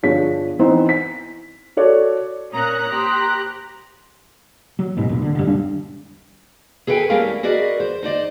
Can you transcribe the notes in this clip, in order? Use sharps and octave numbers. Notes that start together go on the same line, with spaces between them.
G1 F3 D4 G#4 C#5 B6
E3 B3 C4 D#4 C5
B6
F#4 A4 C#5 D5
A#2 C#4 A#4 A#5 D#6 F#6
G4 C5 B5
F#3
A1 G#2 B2 F#3
E1 A#1
D3
G2 D3
E1 G3 D4
G#4 A4 B4 D5 G5 G#5
G3 A3 C#4 E4 A#4 F5
F#4 G#4 A#4 B4 D5 D#5
C5
D#4 C5 D5 D#5